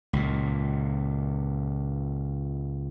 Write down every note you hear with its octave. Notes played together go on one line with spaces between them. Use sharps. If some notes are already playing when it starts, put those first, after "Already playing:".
C#2 A#2